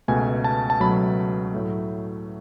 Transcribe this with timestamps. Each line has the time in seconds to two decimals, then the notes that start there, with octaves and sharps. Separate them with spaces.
0.08 C#2 B2 A3 G#5
0.44 A5
0.70 A5
0.80 C#2 B2 F#3 A3 B5
1.54 A2 F#3 A3